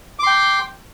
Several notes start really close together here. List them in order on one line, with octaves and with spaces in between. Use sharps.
D6 C6 G5